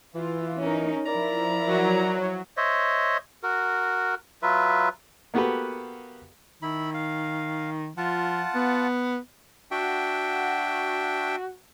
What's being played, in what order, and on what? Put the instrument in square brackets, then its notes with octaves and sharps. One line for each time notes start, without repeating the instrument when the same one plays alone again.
[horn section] E3 [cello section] F4
[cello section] C#4 D#4 A#4
[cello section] F3 E4 [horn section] A#4 D5 A#5
[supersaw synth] F#3
[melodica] C5 C#5 D#5 E5
F#4 A#4
F#3 F4 B4 E5
[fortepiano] A#3 B3 F#4 G4 A4 B4
[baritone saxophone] D#3 [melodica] E4 B5
[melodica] F5
[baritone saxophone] F3 [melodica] F4 F#5 A5
[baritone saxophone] B3
[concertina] D4 E5 G5 [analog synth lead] F#4